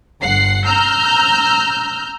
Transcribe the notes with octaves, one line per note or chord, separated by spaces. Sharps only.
G1 F#5 C7
A#5 E6 F6 G6